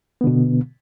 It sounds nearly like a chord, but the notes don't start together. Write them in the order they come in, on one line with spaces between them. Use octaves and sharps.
B3 D3 B2